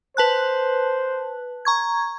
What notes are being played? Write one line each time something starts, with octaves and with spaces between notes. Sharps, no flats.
B4 C5 A5 F#6
A#5 C#6 G#6